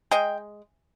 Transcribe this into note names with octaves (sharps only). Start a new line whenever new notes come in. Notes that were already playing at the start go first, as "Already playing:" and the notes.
G#3 D#5 G5